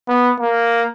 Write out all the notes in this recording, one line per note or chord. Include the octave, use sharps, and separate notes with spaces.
B3
A#3